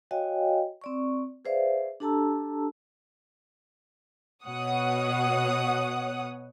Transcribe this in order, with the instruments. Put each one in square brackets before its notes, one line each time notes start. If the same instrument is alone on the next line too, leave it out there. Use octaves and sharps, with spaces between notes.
[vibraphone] F#4 C#5 D#5 F5 G5 G#5
C4 D5 C#6
G#4 B4 C5 D5 E5 F5
D4 G4 A4 A5 A#5 E6
[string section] B2 C#5 F#5 D#6